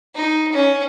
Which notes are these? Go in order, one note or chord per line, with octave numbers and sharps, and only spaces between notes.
D#4
C#4